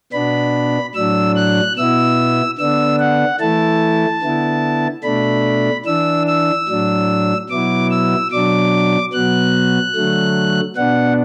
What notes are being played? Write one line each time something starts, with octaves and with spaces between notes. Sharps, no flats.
B2 B3 D4 B5
A2 F#3 D4 E6
F#6
B2 B3 E4 E6
D3 B3 D4 E6
F#5
E3 A3 E4 A5
D3 B3 E4
B2 A3 D4 B5
E3 D4 E6
E6
A2 F#3 D4
B2 F#3 B3 E4 D6
E6
B2 F#3 D4 D6
B2 F#3 B3 F#6
D3 F#3 A3
B2 B3 D4 F#5